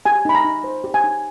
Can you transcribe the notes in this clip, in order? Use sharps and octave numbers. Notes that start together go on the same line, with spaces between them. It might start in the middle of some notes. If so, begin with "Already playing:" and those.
G4 G#5
D#4 B5
A#5
D#4
C5
G4
G#5
D#4